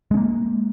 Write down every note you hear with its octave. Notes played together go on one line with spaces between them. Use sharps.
G#3 A#3 C#4